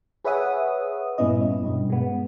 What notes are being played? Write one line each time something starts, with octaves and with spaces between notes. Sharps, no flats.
G#4 B4 C#5 E5 F#5 D#6
G2 A#2 B3 C#4 E4 D#5
G2 B2
G#3 B3